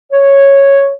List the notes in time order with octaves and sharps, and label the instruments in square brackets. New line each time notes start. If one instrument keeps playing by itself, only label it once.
[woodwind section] C#5